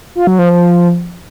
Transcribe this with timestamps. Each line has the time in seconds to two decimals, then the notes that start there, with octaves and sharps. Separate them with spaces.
0.15 F4
0.27 F#3
0.39 F3
0.50 F3